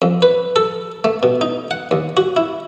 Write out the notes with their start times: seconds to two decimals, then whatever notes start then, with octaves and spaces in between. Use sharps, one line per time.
0.02 F2
0.22 B4
0.56 A4
1.04 A3
1.23 B2
1.41 D#4
1.71 F#5
1.91 D#2
2.17 F#4
2.36 E4